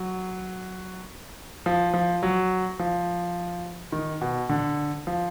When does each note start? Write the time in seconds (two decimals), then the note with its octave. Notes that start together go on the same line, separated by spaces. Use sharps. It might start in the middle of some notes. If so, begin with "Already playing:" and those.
Already playing: F#3
1.66 F3
1.94 F3
2.23 F#3
2.80 F3
3.92 D#3
4.21 B2
4.49 D3
5.07 F3